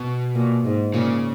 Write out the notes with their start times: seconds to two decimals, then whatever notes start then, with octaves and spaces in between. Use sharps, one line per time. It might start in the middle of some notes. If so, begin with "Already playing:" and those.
Already playing: B2
0.35 A#2
0.65 G#2
0.94 A#2 C#3